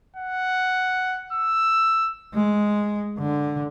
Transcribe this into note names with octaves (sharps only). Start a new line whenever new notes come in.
F#5
E6
G#3
D3